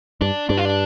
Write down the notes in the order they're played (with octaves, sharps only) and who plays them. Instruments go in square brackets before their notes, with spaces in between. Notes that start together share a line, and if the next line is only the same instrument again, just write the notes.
[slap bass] G2 [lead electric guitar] D4
[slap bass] G2 [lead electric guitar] D4
[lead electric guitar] F4
D4